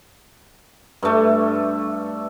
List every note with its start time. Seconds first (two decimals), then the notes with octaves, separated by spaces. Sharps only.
1.03 G2 A3